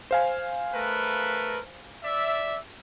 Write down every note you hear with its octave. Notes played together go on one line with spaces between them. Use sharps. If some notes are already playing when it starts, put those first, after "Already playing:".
C5 F5 G#5
A3 A#4 B4
D5 E5